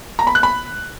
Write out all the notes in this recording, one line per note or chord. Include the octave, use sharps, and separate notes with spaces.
A#5
B5
F#6
B5